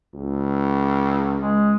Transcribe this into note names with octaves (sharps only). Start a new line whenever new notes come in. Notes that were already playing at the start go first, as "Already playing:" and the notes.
C#2
G#3